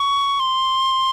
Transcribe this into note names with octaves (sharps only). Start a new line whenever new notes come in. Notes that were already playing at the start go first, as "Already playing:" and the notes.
Already playing: C#6
C6